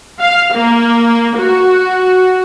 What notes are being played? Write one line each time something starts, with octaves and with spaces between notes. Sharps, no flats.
F5
A#3
F#4